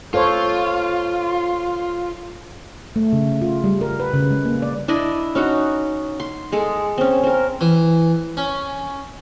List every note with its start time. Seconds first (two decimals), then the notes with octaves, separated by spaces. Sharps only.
0.14 F4 A4 C5 C#5
2.96 A3
3.13 C#3
3.42 F4
3.64 G3
3.81 A#4
4.00 B4
4.14 C#3
4.31 G#3
4.45 A#3
4.62 D5
4.88 D4 E4 D5 D#5
5.35 C#4 D#4 F#4
6.20 C6
6.52 G#3 G#4 A4
6.98 C4 C#4
7.23 C4 A#4
7.61 E3
8.37 C#4